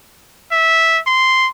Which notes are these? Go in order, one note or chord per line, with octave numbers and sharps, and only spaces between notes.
E5
C6